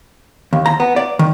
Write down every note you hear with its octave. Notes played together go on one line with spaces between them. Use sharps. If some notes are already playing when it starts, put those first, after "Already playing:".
D#2
A#5
B3
D5
D#3